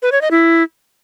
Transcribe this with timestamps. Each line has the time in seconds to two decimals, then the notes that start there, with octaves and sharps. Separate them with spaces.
0.02 B4
0.12 C#5
0.21 D#5
0.31 E4